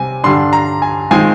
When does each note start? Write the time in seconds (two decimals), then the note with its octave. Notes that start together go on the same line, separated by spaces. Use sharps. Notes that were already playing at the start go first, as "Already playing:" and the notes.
Already playing: C3 G3 C4 G#5
0.24 G2 D3 G3 D4 C6
0.53 A#5
0.82 G#5
1.11 D#3 G#3 C4 F4 G#5